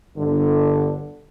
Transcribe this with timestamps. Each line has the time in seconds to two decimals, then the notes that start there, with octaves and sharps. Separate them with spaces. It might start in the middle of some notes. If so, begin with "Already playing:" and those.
0.16 G1 G2 D3